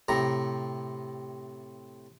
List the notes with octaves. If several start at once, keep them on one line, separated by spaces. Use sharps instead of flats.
A2 C3 A#5